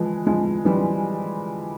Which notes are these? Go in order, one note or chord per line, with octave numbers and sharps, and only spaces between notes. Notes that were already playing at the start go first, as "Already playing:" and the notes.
Already playing: E3 F3 G#3
F3 G#3
E3 G3